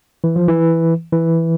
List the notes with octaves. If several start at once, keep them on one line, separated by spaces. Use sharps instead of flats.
E3
F3
E3
E3